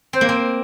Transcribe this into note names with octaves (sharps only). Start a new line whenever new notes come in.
C4 C5
A#3
C4